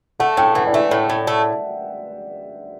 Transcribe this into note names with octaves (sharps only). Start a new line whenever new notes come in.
A3 F#5
A2 G5
E3 F#5
D5
A3 E5
A2
A2
A3